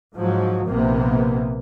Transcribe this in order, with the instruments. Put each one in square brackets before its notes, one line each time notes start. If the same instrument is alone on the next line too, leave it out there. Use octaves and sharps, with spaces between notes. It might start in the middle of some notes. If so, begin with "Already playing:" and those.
[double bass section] G#2 F3 F#3
A#1 C3 A#3 B3